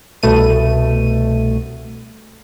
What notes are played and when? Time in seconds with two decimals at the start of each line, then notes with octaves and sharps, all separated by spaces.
0.23 C2 B2 A3 D#7